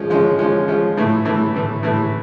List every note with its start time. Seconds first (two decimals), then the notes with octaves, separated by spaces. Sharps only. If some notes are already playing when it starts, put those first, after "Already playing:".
Already playing: F3 G#3 C#4
0.10 F3 G#3 C#4
0.39 F3 G#3 C#4
0.68 F3 G#3 C#4
0.97 A2 E3 A3
1.25 A2 E3 A3
1.54 A2 E3 A3
1.83 A2 E3 A3